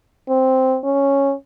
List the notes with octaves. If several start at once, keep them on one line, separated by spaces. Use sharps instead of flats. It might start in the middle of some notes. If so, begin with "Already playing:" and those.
C4
C#4